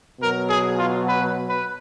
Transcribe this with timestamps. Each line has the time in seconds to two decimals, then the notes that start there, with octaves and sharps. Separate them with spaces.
0.20 B2 F#3 A#4
0.50 G#4
0.78 F4
1.07 B4
1.50 B4